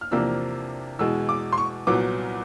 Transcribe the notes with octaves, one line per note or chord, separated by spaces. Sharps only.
F6
E2 C3 F3 A#3 D4 E6
E2 B2 G#3 E6
D6
C6
C#6
C2 A#2 F#3 B3 D6